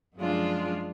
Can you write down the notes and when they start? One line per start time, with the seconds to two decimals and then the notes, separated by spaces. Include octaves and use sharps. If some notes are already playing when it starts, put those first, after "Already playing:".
0.16 F#2 F3 G#3 D4 F4